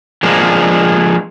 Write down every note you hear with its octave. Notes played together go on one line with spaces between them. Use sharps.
F3 G#3 A#3 D4